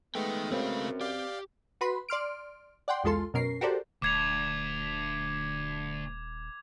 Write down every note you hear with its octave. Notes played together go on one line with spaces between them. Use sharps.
G#3 A3 B3 D#4 G5
F#2 C4 G#4 B4 F5
G4 D5 F5
F#4 B4 B5 C6
D5 C6 F6 D7
D5 F#5 G5 C6
B1 E2 G#3 F4 A4 C6
F#2 B2 C#4 A#4 C7
F#4 G4 A4 A#4 C5 D5
D#1 D2 D6 G#6 F7